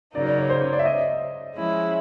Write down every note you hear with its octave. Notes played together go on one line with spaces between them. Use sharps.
C#3 F#3 A#3 D#4 D5
D5
C#5
C5
C#5
D5
E5
D#5
F3 G#3 C#4 E4